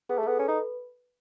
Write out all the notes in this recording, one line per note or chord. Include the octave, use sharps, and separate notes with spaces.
B3 G#4
A3
A4
B3
C#4 B4
D#4